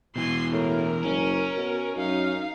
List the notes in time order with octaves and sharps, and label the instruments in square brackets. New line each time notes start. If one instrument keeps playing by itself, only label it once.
[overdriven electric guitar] B2 E3 [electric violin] G#5 C6
[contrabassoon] A2 [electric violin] A#4
[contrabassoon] F#1 [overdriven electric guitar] C#4
[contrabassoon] B2
[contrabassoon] F#2 [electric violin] D#4 F5